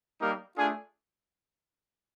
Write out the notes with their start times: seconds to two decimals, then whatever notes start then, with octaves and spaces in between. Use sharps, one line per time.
0.20 G3 A#3 D#4 G4 A#4
0.57 A3 D4 F4 G#4